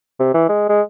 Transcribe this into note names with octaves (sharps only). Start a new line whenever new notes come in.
C3
E3
G#3
G#3